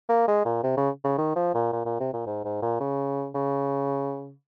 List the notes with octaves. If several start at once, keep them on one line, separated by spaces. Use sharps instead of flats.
A#3
G#3
A#2
C3
C#3
C#3
D#3
F3
A#2
A#2
A#2
C3
A#2
G#2
G#2
A#2
C#3
C#3